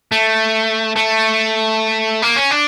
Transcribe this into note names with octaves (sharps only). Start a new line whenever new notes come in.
A3
A3
A#3
C#4
D4